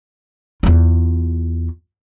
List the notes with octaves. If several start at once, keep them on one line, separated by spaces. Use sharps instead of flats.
E2 F4